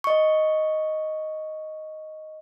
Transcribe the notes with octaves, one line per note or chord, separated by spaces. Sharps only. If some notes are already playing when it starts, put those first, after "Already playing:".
D#5 C#6